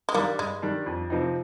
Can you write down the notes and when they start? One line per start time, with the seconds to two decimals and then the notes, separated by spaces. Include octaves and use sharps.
0.09 G#3
0.14 D#3 G3 A#3 D4
0.39 G2 G#3
0.62 D#3 G3 D4
0.86 F2
1.10 C3 F3 C4 D#4